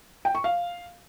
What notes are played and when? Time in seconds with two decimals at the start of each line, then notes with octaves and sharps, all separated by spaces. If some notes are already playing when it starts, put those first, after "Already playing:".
0.25 G5
0.35 C#6
0.44 F5